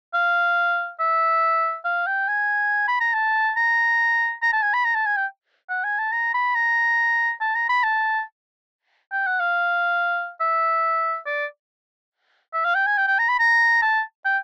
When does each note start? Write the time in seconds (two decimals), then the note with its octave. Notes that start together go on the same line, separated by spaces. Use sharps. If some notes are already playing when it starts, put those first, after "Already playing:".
0.13 F5
0.99 E5
1.84 F5
2.07 G5
2.28 G#5
2.87 B5
3.00 A#5
3.13 A5
3.56 A#5
4.42 A#5
4.53 A5
4.62 G#5
4.73 B5
4.84 A#5
4.94 A5
5.06 G#5
5.16 G5
5.69 F#5
5.84 G#5
5.98 A5
6.12 A#5
6.34 B5
6.55 A#5
7.41 A5
7.55 A#5
7.69 B5
7.83 A5
9.12 G5
9.26 F#5
9.40 F5
10.40 E5
11.26 D5
12.53 E5
12.64 F5
12.74 G5
12.86 G#5
12.97 G5
13.07 G5
13.18 A#5
13.29 B5
13.39 A#5
13.82 A5
14.25 G5